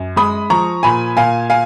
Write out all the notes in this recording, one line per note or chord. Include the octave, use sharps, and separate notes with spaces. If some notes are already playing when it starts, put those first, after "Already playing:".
Already playing: F#2
G#3 B5 D#6
F3 A#5 C#6
A#2 G#5 B5
A#2 F5 G#5
F5 G#5